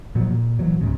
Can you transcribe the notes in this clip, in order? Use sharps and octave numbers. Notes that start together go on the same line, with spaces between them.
A#2 F3 F#3
A#2
A#2 E3 F#3
C#2 G#2 C#3